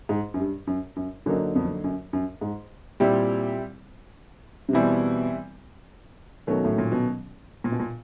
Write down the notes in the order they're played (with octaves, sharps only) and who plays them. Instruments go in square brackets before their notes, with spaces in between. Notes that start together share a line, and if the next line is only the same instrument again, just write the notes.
[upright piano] G#2
F#2
G2
F#2
F#2
[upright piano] F#2 [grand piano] D3 F#3 A#3 D#4
[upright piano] F2
F#2
F#2
G#2
[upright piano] A#2 [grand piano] G3 C4 E4 G4
[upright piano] C3
[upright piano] B2 [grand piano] E3 G3 C4 E4
[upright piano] B2 [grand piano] D#3 F#3 A3 C#4 F#4
[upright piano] A2
A#2
B2
A#2
B2
A#2